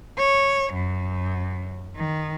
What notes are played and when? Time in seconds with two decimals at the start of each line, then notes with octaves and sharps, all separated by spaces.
0.19 C#5
0.73 F#2
1.96 D#3